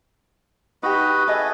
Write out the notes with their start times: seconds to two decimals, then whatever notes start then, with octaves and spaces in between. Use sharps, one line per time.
0.83 D#4 F#4 G4 B4 D#5
1.27 G#4 A4 B4 D#5 E5